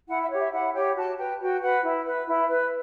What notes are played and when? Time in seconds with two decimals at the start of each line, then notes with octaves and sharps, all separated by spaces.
0.08 E4 F#5
0.23 E5
0.29 G4 C#5
0.38 E5
0.51 E4 F#5
0.73 G4 C#5 G5
0.96 F#4 A5
1.18 B4 G5
1.40 F#4 G5
1.61 B4 F#5
1.83 E4
2.05 B4
2.27 E4
2.49 B4